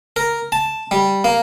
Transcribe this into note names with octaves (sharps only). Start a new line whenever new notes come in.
A#4
A5
G3
A#3